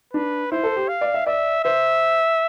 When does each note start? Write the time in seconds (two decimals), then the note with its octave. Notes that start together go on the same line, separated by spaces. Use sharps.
0.13 D4 B4
0.51 E4 C5
0.63 A4
0.76 G4
0.89 F5
1.01 D5
1.14 E5
1.26 D5 E5
1.64 C5 E5